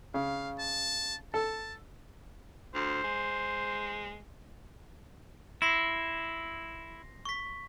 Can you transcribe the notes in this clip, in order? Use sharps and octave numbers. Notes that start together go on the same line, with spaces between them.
C#3 F5
A5
A4 A5
D2 C5
G#3
E4 C6 A#6 C7
C#6 B6